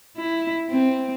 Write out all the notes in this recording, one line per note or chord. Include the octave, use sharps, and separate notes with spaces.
E4
C4